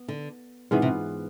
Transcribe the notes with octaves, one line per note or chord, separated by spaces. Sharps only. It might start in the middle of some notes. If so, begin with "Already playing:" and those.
Already playing: B3
D3
G#2 C3 E3 B3 F4
C3